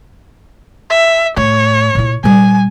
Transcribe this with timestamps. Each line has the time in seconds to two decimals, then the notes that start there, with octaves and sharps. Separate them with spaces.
0.90 E5
1.37 A2 C#5
1.95 A#2 E4
2.24 A#2 G3 G#5